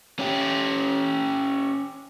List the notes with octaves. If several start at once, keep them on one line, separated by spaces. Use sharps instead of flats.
C#4 G4